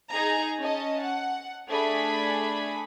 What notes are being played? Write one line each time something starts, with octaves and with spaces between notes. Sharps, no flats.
D#4 G#4 A#5
C#4 D#5 A5
F#5
A3 D4 G#4 B5